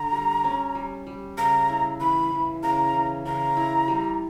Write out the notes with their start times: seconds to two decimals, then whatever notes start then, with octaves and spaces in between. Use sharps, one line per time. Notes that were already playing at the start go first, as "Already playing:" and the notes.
Already playing: D3 A#5
0.13 G3
0.44 C#4
0.75 G3
1.07 G3
1.38 C#3 A#5
1.69 E4
2.00 E3 B5
2.32 E3
2.63 C#3 A#5
2.94 E3
3.25 C#3 A#5
3.57 E4
3.88 G3